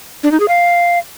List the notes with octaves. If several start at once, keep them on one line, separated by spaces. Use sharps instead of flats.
D4
D#4
G#4
F5